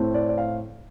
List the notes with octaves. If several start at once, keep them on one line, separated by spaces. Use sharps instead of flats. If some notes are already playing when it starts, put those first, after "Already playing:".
Already playing: A2 A3 C4
D5
D5
F5